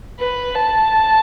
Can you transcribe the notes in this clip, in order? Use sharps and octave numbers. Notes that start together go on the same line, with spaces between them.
B4
A5